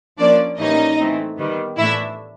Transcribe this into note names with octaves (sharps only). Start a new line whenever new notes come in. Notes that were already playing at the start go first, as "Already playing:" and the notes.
F3 A#3 C#4 D4 D5
A2 E3 G3 A#3 C#4 D#4 D#5
E3 A3 C4
D#3 G3 B3
A2 E3 A3 D4 E4 E5